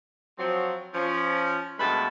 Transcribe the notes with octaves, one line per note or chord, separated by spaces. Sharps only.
F3 F#3 C4
F3 C#4
G2 B2 G#3 A3 A5 B5